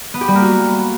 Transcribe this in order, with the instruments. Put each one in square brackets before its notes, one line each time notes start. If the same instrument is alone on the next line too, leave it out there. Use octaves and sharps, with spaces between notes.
[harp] B3
G4
G3
A#3
F#4